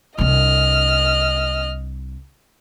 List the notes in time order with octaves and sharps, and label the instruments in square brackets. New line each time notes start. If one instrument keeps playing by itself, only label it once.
[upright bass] C2 D4 [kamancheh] D#5 F6